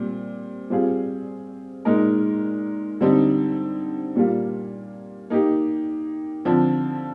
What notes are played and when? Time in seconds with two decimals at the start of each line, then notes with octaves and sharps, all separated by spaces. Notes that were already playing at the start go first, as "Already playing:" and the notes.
Already playing: A#2 G3 C4
0.70 G3 C4 F4 G#4
1.85 A#2 G#3 D#4 A#4
3.01 D3 G3 C4 D#4
4.16 A#2 G3 A#3 F4
5.30 A#3 D#4 G4
6.45 D3 F3 C4